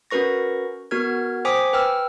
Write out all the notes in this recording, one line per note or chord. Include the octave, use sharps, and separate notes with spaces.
C#4 F#4 A#4 B4 C#6 A#6
B3 F#4 A#4 F6 G#6
C5 G5 G#5 D6 D#6 B6
B4 G5 E6 F6